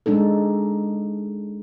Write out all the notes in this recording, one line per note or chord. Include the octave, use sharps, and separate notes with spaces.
G#3 D4 D#4 A4